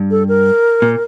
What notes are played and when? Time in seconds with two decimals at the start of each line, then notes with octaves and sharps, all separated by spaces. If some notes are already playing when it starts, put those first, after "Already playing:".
Already playing: G2
0.11 A4
0.28 A#4
0.82 A#2